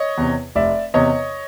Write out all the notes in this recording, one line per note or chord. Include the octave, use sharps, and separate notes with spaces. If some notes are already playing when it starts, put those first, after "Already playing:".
Already playing: C#5 D#5
E2 C3
F1 D5 E5
E2 C3 C#5 D#5